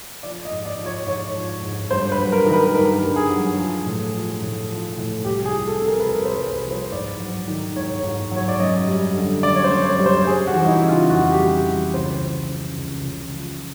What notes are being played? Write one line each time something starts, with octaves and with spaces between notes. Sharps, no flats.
F3 D5
D#5
G#2
D5
F3
C#5
G#2 C#5
F3
G#2
G2 C5
B4
F#3
A#4
D#3 A#4
B4
G2 A#4
G2
G#4
F#3
F3
A2
F3
A2
F3
A2
C2 G4
G#4
F3
A4
C3
A#4
B4
C2 A#4
C5
B4
C2
B4
F3
C5
G#2 D5
F#3
D#3
G#2 C#5
G#2
F#3 C#5
D5
F#2 D#5
G3
D3
F#2 D5
C#5
C5
F#2
C#5
G3
C5
G3 G#4
F#4
E3
D#4
E4
C#3
F4
F2 F#4
G4
G3
E3
C#2 C5
F3
C#3
C#2
C#2
F3